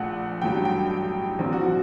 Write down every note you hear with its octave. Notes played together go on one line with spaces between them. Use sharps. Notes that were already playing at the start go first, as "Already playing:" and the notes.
Already playing: A#1 A#2 A3 F#5
A1 G2 F#3 A3 G5
G5
A#1 A#2 F#3 C4
F#4
F#4